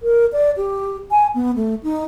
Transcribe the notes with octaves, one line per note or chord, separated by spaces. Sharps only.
A#4
D5
G4
G#5
B3
A3
D#4